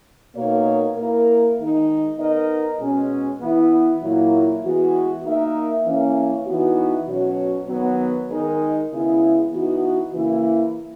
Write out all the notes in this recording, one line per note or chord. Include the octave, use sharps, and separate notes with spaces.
B2 A#3 D#4 A#4 C#5
A#3 E4 A#4
D#3 G#3 D#4
B3 D#4 A#4 D#5
B2 G#3 C#4
E3 B3 E4
A#2 F#3 A#3 E4
E3 G#3 B3 F#4
A#3 D#4 A#4 E5
E3 A#3 C#4
E3 B3 D#4 F#4
B2 F#3 C#4 F#4 C#5
D#3 F#3 B3
D#3 G#3 D#4 A#4 D#5
C#3 G#3 B3 E4
E3 B3 D#4 F#4
C#3 E3 A#3 E4